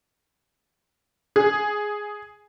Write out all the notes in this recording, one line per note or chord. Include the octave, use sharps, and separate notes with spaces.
G#4